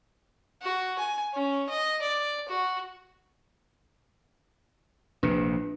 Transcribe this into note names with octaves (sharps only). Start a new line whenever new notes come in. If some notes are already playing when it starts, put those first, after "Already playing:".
F#4
G#5
C#4
D#5
D5
F#4
A#1 C3 D4